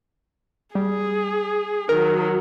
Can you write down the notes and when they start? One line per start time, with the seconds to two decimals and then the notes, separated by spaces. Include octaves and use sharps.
0.75 G3 G#4
1.89 D#3 F#3 A#4